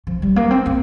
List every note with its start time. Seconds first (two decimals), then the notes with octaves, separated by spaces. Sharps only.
0.07 F3
0.22 G3
0.36 A#3
0.51 C4
0.66 C4